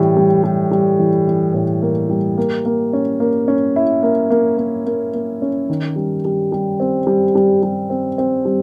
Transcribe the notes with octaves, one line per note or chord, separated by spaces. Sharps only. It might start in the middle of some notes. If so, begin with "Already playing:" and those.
Already playing: A2 E3 G3
G3
G3
G3
E3
E3
A2
A#3
G3
A#3
A#3
C#4
A#3
C#4
E4
A#3
A#3
A#3
A#3
A#3
C#4
D#3
G3
G3
G3
C4
G3
G3
G3
C4
C4
G3